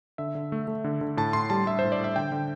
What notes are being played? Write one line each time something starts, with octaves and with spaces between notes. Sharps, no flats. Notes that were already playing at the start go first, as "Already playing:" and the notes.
D3 E5
D3
A3
A3
D3
D3
A2 A5
A2 C6
G3 A5
G3 E5
A2 C5
D5
A2 E5
D3 G5
D3